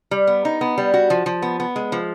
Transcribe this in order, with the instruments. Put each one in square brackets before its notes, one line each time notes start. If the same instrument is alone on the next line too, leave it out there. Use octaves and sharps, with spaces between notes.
[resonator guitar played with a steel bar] G3
B3
D#4
B3
G3
F#4
F3
F3
B3
B3
G#3
F3